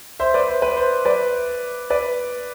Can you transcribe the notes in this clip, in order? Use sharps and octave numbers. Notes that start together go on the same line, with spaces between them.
C5 E5
B4 D5
C5
B4
C5
B4 D5
B4 D5